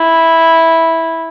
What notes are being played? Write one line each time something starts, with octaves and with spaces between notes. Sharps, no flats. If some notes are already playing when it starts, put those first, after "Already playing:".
Already playing: E4